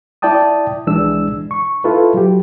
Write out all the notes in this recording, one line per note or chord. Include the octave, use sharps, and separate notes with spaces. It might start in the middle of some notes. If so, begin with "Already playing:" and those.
E4 D5 G5 A5 D#6
C2 E3 G#3 D4 E6
C#6
E4 F4 A4 B4
F#3 G4